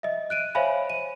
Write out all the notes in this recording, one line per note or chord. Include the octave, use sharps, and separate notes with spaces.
D#5 E5
F#6 D7 D#7
C5 C#5 E5 F5 G#5 B5
D#7